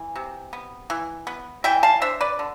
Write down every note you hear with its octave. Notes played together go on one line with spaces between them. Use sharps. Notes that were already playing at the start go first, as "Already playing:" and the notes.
Already playing: E3
C3
B3
E3
B3
E3 E5 G5
F5 A5
D4 C5 E5
B4 D5
D3